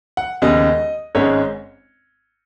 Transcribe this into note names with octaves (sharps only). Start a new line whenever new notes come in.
F#5
D#2 C#3 G#3 B3 D#5
G#1 G#2 G#3 C#4 C#5